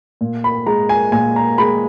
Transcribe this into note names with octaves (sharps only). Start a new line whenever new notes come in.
A#2
B5
G#3 A#5
G#5
A#2 G#5
A#5
G#3 B5